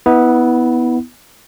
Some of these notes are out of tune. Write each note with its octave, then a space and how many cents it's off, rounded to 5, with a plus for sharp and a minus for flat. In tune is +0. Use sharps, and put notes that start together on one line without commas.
B3 +0 E4 -30